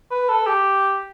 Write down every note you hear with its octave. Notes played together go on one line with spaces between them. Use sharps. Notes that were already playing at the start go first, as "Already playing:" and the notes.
B4
A4
G4